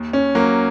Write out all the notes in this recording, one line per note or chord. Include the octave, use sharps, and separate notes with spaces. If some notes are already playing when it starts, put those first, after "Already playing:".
Already playing: D#2
C#4
F#3 A#3